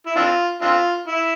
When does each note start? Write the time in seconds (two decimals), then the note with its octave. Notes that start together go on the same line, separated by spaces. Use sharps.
0.07 E4
0.16 C4 D4 F4
0.62 C4 D4 F4
1.07 E4